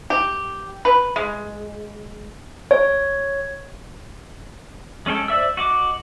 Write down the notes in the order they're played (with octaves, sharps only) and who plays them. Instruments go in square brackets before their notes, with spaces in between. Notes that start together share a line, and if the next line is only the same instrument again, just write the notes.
[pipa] G4
B4
G#3
[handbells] C#5
[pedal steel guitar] G#3 C#4 A4 G5
C5 D5 E5 E6
F#4 D#5 D6